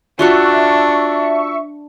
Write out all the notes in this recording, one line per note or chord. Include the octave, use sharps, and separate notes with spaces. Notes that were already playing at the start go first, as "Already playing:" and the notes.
D4 F4 F#4 E5 F#5 C#6